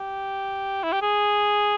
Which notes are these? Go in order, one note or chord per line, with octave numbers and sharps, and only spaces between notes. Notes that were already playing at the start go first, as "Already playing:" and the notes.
Already playing: G4
E4
G4
G#4